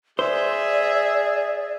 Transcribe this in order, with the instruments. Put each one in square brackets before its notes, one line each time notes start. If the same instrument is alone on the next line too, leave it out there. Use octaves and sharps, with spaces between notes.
[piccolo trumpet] G#4 [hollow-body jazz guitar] C5 [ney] D5 [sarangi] E5